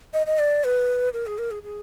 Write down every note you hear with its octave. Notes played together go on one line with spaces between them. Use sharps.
D#5
D#5
D5
B4
A#4
G#4
A#4
G#4
G#4